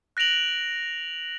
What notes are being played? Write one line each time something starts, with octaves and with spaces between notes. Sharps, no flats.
F#6 A#6 D7 F7 F#7